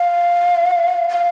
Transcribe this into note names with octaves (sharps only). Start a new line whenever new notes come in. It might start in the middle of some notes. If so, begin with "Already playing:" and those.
Already playing: F5
F5